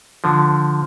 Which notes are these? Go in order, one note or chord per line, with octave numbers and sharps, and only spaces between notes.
D3 F3